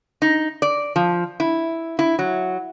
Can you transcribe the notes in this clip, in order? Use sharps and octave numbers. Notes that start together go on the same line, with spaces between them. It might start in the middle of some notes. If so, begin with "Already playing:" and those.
D#4
D5
F3
E4
E4
F#3